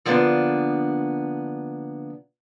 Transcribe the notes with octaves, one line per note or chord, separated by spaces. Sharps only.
D3 F3 A#3 B3 C#4 D4